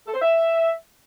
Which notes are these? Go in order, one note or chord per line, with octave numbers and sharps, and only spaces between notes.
A4
C5
E5